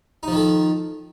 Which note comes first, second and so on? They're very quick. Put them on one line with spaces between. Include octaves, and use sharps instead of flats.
D#4 F3 D#3 A4